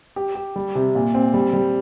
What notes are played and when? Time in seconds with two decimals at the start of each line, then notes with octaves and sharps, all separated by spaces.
0.16 G4
0.35 G4
0.56 G3
0.75 C3
0.95 A#2
1.15 C4
1.34 G3
1.53 G3